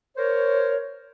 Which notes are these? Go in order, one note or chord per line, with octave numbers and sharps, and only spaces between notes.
A#4 C5 C#5